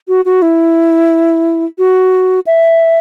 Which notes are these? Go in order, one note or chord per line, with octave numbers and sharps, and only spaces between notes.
F#4
F#4
E4
F#4
E5